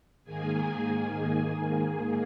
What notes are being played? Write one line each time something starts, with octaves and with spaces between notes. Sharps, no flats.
G#2 D#3 A#3 G#4 G#5